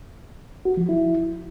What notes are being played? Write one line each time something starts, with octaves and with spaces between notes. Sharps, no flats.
F#4
F3
E4